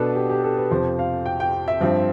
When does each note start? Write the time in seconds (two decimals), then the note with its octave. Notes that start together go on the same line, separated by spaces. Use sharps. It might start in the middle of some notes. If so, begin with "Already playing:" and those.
Already playing: B2 B3 D4 A4 B4
0.15 G4
0.30 G4
0.44 A4
0.57 B4
0.71 F2 C3 F3 C5
0.99 F5
1.26 G5
1.40 G5
1.68 E5
1.81 G2 F3 C4